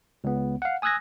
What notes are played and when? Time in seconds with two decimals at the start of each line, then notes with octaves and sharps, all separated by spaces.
0.24 C#2 B3
0.62 F5 F#5
0.82 G#5 D#6 E6 F#6 G#6 A#6